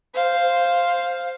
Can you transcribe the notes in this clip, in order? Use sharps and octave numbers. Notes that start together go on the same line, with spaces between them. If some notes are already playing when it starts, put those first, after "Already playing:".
C5 F5